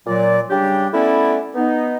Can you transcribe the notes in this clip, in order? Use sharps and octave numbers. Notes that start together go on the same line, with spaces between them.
A#2 F#3 D5
C#3 G3 D4 G4
A3 B3 C#4 E4 B4 D5
B3 D#4